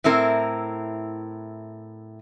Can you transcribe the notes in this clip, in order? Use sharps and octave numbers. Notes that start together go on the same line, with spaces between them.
A2 C4 E4 A#4